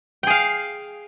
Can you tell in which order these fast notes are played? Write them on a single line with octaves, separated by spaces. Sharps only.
G5 G#4 F5